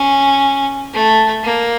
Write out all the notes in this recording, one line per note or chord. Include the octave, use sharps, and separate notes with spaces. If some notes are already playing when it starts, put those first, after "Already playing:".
Already playing: C#4
A3
A#3